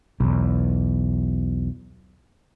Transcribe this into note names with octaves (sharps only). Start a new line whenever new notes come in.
B1 E2